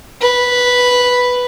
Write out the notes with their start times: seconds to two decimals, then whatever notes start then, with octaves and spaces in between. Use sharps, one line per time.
0.21 B4